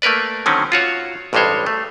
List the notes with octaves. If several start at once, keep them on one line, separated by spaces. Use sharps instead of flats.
A3 A#3 A#4 B4 D5
D3 D#3 F#3 C4 C#4
F4 F#4 C#5
A1 G2 G3 G#3 C5 C#5
A3